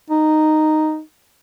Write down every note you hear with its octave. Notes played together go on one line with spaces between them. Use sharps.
D#4